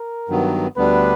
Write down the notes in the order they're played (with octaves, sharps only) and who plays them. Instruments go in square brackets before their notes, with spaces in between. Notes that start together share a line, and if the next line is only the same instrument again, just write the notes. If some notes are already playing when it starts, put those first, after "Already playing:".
Already playing: [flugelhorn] A#4
[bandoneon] G2 D#3 F#3 B3
[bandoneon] D2 D3 G3 B3 D4 [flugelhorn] B4